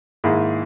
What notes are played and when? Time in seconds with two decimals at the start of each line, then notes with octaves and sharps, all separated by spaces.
0.24 G#2 D#3 A#3 E4 G#4